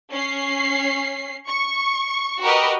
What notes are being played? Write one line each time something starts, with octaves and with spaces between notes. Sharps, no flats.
C#4 C7
C#6
F#4 G4 A#4 B4 D#5